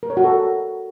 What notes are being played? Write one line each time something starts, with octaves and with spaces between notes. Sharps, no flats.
A#4
C#5
F#4
A4